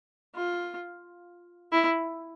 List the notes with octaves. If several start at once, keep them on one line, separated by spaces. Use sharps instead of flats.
F4
E4